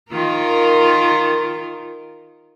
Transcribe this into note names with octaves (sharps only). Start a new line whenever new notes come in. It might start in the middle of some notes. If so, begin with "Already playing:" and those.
D#3 F4 A#4